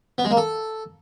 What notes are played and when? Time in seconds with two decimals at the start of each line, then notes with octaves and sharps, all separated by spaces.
0.18 B3
0.25 G#3
0.31 A#3
0.37 A4